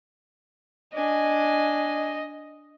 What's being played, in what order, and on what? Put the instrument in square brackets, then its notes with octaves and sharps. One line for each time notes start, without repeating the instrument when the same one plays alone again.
[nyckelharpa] D4 G#5 [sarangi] D#5